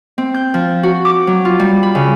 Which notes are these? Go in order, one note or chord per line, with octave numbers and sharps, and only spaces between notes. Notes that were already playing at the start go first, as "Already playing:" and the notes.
C4
G6
F3
F#4
D6
F#3
F4
G3
B5
C#3